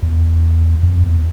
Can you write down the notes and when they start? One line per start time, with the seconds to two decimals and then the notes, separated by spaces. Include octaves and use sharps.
0.03 E2
0.83 F2
1.04 E2